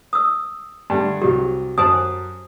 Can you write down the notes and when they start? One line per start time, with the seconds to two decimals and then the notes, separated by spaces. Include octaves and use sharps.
0.13 D#6 E6
0.90 G2 D3 A3
1.22 C2 F#3 G4
1.78 F#2 C5 G#5 A5 D#6